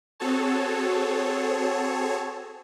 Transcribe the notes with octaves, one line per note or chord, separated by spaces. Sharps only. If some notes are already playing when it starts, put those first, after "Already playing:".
C4 F#4 G#4 A4 C#5 A5